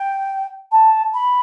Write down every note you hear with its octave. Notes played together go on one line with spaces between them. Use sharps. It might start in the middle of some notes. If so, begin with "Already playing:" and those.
Already playing: G5
A5
B5